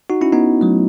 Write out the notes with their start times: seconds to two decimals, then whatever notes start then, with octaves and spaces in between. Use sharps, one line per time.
0.10 D#4 F#4
0.21 C#4 E4
0.32 B3 D#4
0.61 F#3 A3